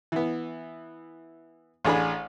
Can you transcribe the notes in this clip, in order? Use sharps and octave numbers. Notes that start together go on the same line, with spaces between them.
E3 B3
A1 D4 G#4 B5